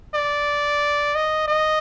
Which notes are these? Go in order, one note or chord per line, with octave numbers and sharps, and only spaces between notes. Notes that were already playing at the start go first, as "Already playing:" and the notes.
D5
D#5
D#5